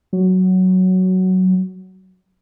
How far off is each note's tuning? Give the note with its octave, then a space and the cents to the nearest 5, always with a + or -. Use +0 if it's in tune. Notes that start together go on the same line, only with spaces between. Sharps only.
F#3 +5